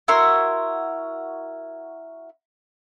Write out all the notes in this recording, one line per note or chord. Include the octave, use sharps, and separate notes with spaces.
E4 F#4 A#4 C6